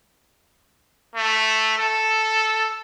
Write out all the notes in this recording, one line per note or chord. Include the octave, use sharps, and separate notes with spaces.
A3
A4